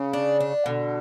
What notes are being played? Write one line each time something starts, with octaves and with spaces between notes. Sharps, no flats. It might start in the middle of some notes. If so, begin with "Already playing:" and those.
Already playing: C#3
D4
D4
B2 D3